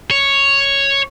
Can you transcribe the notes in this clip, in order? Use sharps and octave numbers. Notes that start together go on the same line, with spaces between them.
C#5